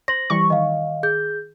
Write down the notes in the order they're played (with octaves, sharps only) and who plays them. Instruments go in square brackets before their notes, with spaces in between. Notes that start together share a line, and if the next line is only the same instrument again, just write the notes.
[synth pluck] C5 [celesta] A#6 F#7
[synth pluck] E3 G3 C#6
[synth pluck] D#3 [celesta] D#5 F5
[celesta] G#4 G6